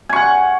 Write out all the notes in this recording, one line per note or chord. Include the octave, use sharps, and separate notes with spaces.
F#5 G#5 C#6